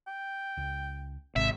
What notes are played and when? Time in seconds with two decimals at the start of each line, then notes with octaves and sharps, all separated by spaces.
0.07 G5
0.57 C#2
1.36 G#1 C3 E5